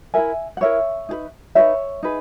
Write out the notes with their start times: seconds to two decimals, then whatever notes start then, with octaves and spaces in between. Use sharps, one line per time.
0.14 E4 A#4 E5 G#5
0.57 F#5
0.61 E4 A#4 C#5 E5
1.09 D#4 G#4 B4
1.55 D#4 G#4 B4 C#5 E5
2.03 D#4 G#4 B4